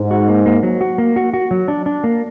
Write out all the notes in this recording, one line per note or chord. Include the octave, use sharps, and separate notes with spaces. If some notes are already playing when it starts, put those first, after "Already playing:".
Already playing: G#2
F#4
A#3
A#3
F#3
F#4
A#3
F#4
F#4
F#3
D4
D4
A#3